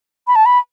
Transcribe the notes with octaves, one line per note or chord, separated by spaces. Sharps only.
B5
A5
B5